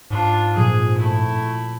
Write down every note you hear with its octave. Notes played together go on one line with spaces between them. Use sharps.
G#2 D4 F4
A#2 F3 G#4
A3 E4